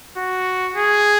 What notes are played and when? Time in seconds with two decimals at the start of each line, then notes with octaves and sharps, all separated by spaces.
0.17 F#4
0.75 G#4